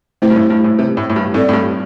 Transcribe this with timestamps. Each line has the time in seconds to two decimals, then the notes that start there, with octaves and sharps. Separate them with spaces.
0.22 C3 A3 E4 C5
0.30 G2
0.36 A2
0.50 G2
0.64 A2
0.79 C3
0.97 A2
1.10 A2
1.16 G2
1.34 A2 C4 A4 D5
1.49 A2
1.53 G2